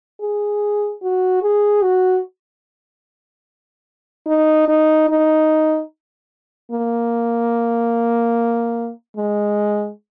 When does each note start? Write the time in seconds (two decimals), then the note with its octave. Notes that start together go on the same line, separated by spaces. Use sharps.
0.21 G#4
1.02 F#4
1.42 G#4
1.83 F#4
4.27 D#4
4.68 D#4
5.09 D#4
6.72 A#3
9.17 G#3